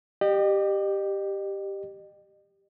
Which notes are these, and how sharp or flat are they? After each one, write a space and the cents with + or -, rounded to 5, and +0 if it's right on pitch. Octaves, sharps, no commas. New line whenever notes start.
G4 +0 D#5 -40